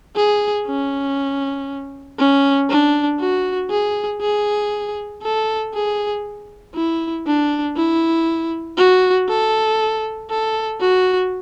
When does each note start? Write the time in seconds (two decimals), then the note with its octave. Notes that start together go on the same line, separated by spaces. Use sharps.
0.16 G#4
0.67 C#4
2.18 C#4
2.70 D4
3.19 F#4
3.70 G#4
4.21 G#4
5.22 A4
5.74 G#4
6.75 E4
7.26 D4
7.76 E4
8.77 F#4
9.28 A4
10.30 A4
10.81 F#4